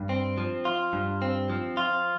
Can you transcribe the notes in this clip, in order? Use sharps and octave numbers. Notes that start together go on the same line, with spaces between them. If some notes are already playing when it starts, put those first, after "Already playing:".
Already playing: G2
C4
F3
F4
G2
C4
F3
F4